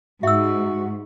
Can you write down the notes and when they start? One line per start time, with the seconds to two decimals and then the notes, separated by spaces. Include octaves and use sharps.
0.23 G#2 F#4 E5 E6